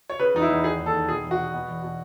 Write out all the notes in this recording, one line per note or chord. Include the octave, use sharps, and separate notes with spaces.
C#5
C#3 B4
E2 D#4
E4
E2
D#3 G#4
D#2
A4
D#3
B2 G#4
E2
F#4
B2
B2
E2
B2